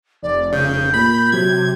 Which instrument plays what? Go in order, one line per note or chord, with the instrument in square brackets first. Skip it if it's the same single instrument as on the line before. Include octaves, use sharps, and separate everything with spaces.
[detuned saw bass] F1 [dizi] D5
[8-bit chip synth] C#3 [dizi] G6
[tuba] A#2 [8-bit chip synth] B5
[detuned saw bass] C3 [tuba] F#3 [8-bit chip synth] G#6